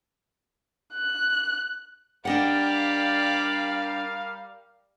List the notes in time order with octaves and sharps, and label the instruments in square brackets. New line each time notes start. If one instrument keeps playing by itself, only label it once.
[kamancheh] F#6
[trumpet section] G3 A#4 F5 [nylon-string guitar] D4 D#5 F#5 [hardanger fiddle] G4 D5